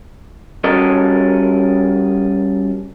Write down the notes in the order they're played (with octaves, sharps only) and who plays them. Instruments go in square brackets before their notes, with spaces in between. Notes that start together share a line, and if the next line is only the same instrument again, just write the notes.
[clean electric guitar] G3 C#4 F#4 A4 A#4 D#5